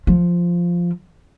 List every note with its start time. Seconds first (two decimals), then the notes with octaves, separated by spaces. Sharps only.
0.07 F3